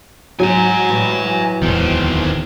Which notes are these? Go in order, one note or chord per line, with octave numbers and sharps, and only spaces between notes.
G#2 F#3 G#5 A#5
A2 E3 G3
D1 E2 D#3 C4